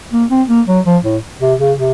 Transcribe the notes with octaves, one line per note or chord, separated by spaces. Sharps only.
A#3
C4
A#3
F#3
F3
A2
C3
C#3
C3